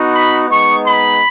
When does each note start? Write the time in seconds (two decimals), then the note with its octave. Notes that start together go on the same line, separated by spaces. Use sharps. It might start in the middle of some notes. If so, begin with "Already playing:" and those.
Already playing: B3 D#4 F#4
0.13 B5
0.49 G#3 B3 D#4 C#6
0.85 B5